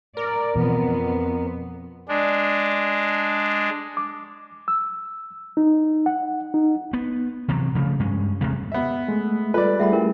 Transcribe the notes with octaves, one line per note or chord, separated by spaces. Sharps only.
A#4 D5
F2 B2 E3 B3
G#3 D4
D6
E6
D#4
F#5
D#4
B3
C3 E3 F#3
C#3 F3 A3
G2 G#3 C#4
E2 C3 G#3 A3
B3 E5
G#3 A3
G3 F4 A4 B4 D5
G3 A3 G#4 E5 F#5 B5
C#4 E4 A#4